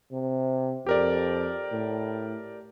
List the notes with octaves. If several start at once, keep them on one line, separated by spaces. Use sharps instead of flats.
C3
F2 G4 A#4 D5
A2